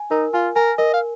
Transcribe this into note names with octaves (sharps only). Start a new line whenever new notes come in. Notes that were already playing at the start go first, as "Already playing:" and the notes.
Already playing: G#5
D#4 A#4
F4 G#5
A#4 G#5
A#4 D#5
F5